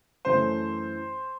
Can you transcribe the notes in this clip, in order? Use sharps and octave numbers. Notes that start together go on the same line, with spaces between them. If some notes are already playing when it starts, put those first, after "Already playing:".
F#2 E3 A3 C5